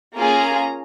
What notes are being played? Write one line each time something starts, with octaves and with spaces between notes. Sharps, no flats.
A#3 C#4 F4 G#4 A#5